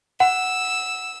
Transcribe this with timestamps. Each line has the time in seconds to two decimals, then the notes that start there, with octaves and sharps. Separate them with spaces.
0.20 F#5 E6